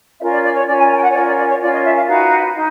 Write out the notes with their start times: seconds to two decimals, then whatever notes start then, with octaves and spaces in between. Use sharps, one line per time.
0.19 C#4 F4 A#4 E5
0.31 D5
0.43 D5
0.55 C#5
0.66 C#4 F4 A#4 D5
0.78 G#5
0.91 G#5
0.96 G5
1.02 F#5
1.09 C#5
1.14 C#4 F4 A#4 D5
1.25 D5
1.37 D5
1.49 C#5
1.61 C#4 F4 A#4 D5
1.72 D#5
1.84 E5
1.96 F5
2.07 D#4 F#4 B4 F5
2.54 D#4